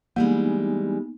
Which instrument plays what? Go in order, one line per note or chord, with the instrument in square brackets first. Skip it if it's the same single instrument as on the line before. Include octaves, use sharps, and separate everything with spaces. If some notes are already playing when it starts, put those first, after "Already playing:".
[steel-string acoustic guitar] E3 G3 G#3 [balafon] A#3 [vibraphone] B3 D#4